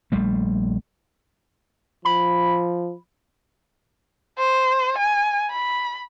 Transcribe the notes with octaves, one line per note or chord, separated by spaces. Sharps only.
A#1 G3 A3
F3 B5
C5
G#5
B5